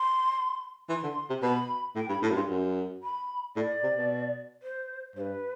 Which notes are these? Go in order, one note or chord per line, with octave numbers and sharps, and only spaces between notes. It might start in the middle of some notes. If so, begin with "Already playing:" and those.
Already playing: C6
E3 C6
D3
C3
B2 B5
A2 G5
G2 B5
A2
F#2
G2 C6
F#2
B5
A2 D5
C3
B2
C5
G2 B4 C5